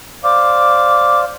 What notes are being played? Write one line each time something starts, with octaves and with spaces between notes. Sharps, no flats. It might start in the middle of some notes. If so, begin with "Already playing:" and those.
C5 D5 F5 D6